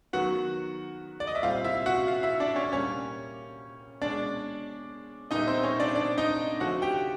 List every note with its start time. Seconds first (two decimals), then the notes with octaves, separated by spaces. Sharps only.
0.13 D#3 F#3 B3 F#4 F#5
1.20 D5
1.27 D#5
1.35 E5
1.42 A#2 G3 C4 F4 F5
1.64 E4 E5
1.86 F#4 F#5
2.07 F4 F5
2.23 E4 E5
2.40 D4 D5
2.56 C#4 C#5
2.72 A#2 G3 A#3 C#4 C#5
4.02 B2 G#3 C#4 D4 D5
5.31 A#2 G3 B3 D#4 E4 D#5
5.47 C4 C5
5.63 C#4 C#5
5.80 D4 D5
5.95 D4 D5
6.18 D#4 D#5
6.60 D3 F3 A3 C#4 F#4 F#5
6.82 G4 G5